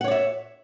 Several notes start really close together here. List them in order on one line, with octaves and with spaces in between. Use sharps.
F#5 C#5 D5 E5